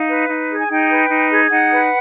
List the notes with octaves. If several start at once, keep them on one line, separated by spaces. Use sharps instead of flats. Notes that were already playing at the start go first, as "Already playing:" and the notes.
Already playing: D#4 F5
B4
D#4
G#4
G#5
D#4 G5
B4
D#4
G#4
D#4 F#5
B4